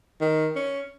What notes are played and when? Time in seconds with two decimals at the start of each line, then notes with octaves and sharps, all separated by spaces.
0.21 D#3
0.56 C#4